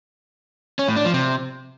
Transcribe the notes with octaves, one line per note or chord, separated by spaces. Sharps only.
C#4
A2
D4
F3
C3